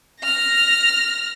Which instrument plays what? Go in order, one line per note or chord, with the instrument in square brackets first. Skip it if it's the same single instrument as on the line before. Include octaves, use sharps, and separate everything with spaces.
[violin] F6 A#6